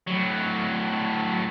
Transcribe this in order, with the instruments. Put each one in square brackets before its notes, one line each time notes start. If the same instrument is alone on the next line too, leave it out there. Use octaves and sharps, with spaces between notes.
[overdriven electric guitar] A2 F#3